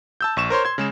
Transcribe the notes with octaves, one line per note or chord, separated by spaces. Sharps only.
A5 E6 G6
A#1 C#6 E7
A#4 C5 C#5 C6
C6 G#6
C#3 G#3 E7